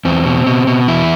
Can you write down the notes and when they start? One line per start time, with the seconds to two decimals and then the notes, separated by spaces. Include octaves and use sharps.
0.05 E2 C4
0.26 B2
0.47 B2
0.67 B2
0.88 E2 E4